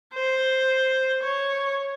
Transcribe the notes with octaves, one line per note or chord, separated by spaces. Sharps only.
C5
C#5